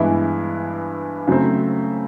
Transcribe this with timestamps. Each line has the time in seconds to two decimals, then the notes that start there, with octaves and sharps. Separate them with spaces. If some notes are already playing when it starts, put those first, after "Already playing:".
Already playing: G2 E3 G#3 B3 E4
1.27 C#3 F#3 A3 C4